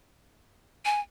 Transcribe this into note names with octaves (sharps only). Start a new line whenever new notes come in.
G#5